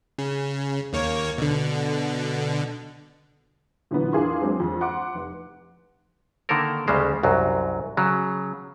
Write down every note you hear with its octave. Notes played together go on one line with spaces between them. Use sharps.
C#3
D#2 A#3 C#5
B2 D3
A#2 D3 E3 F#3 B3
E2 D4 F4 G#4 A#4 C6
F#3 G#3 C4 D4
F2
F#5 C6 D6
F1
D3 D#3 A#3 A4 A#4
D2 C#3 G3 G#3 C5
C2 F#2 F#3
C#3 F#3